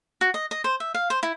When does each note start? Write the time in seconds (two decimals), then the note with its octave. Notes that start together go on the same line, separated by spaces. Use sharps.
0.21 F#4
0.34 D#5
0.51 D#5
0.64 C5
0.80 E5
0.94 F5
1.10 C5
1.23 E4